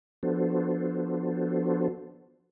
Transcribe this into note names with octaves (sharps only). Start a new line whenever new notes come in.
F3 B3 D4 F#4 A4 C5